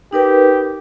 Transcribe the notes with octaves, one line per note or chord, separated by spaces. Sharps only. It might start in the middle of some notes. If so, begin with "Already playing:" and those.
D#4 G4 A#4 B4